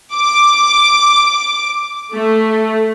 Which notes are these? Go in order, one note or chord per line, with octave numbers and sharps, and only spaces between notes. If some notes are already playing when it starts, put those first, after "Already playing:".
D6
A3